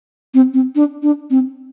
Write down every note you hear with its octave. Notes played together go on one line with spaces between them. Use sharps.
C4
C4
D4
D4
C4